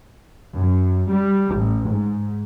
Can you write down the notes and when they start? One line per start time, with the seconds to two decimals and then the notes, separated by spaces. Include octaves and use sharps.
0.56 F#2
1.11 G3
1.57 A1
1.93 G#2